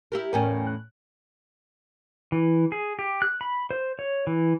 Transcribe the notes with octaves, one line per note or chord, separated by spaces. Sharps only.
E4 G4 A#4
E2 A2 C#4 A#4 G5 G#5
F#6
E3
G#4
G4
F#6
B5
C5
C#5
E3